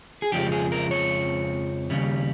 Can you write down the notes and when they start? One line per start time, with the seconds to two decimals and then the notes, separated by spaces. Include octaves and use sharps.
0.22 G#4
0.32 F2 C#3 F3 G#3 G4
0.52 G#4
0.72 A#4
0.91 C#5
1.90 D#2 C#3 G3